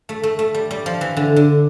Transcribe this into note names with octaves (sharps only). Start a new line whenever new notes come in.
A3
A3
A3
G3
G3
F3
E3
D3
D3